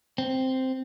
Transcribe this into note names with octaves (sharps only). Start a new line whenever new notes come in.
C4